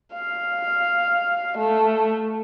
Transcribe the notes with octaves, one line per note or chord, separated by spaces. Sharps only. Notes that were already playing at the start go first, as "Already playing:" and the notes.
F5
A3